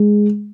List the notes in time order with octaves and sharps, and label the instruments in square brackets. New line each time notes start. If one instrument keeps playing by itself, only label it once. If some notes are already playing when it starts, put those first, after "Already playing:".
Already playing: [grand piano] G#3